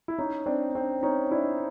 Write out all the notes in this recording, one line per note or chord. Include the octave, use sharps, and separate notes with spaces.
E4
C#4 D#4
C4 D4
C4 D4
C#4 D#4
D4 E4